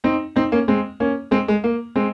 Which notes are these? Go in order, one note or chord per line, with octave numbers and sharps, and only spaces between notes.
C4 D#4
C4 D#4
A#3 C#4
G#3 C4
A#3 C#4
G#3 C4
G#3
A#3
G#3 C4